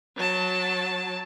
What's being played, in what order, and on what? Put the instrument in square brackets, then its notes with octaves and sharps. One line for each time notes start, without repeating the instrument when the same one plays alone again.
[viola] F#3 A5